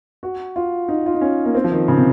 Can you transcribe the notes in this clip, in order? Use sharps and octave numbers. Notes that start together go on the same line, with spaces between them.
F#4
F4
D#4
F4
D#4
C#4
A#3
C4
F3
D#3
C#3
C3